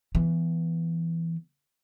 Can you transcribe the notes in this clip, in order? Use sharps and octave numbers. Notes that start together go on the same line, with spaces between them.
E3 B3